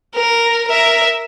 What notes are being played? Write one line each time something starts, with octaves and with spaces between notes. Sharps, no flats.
A#4
A#4 E5